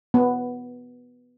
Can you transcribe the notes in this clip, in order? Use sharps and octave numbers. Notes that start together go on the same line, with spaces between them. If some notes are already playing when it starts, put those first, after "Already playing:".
B3